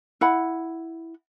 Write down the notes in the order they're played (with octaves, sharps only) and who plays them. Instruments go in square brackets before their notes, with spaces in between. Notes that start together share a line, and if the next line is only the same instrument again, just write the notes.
[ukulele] E4 F#5 B5